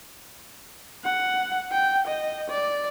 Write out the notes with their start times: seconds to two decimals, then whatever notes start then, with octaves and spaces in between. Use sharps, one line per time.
1.05 F#5
1.72 G5
2.08 D#5
2.50 D5